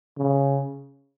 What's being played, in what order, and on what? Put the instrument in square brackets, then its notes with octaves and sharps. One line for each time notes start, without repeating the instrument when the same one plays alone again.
[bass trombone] C#3